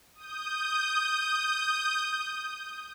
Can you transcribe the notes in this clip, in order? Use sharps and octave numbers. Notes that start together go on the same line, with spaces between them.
D#6 G6